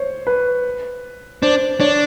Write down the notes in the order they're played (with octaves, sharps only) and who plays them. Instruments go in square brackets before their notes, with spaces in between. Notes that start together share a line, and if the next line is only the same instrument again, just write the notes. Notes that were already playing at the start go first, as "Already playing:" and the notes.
Already playing: [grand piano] C5 C#5
B4
[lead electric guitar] D4 [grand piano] C5
[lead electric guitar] D4 [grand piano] C#5